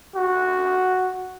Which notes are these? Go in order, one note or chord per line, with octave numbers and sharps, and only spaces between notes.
F#4